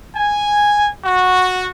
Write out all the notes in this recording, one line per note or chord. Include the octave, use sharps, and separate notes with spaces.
G#5
F#4